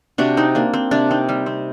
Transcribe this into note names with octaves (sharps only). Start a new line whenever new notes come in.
C3 D4 F#4
C4 D#4
A#3 D4
C4
C3 D4
C4 D#4
G3
C4